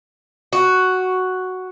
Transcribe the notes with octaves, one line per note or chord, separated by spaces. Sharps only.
F#4